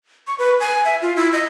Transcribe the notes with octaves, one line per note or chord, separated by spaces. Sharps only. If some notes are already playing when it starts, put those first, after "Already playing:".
C#6
B4
G#5
E5
F4
E4
D#5